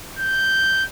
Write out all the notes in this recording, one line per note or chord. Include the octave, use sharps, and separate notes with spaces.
G6